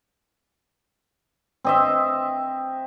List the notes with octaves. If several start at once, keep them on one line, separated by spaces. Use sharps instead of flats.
C4 D#5 E5